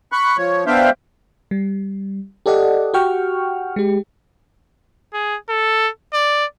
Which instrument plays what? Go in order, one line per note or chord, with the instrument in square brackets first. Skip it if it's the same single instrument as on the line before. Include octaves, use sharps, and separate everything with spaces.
[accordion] B5 C#6 F#6
F3 C#5
B3 D4 C5 E5 F5 G5
[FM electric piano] G3
G4 A4 D5 D#5 F#5
F#4 G4 F#5 G5 C#6 F6
G#3 G4
[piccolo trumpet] G#4
A4
D5